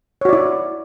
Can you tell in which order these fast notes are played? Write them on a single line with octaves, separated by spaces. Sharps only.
C#5 F#4 D5 E4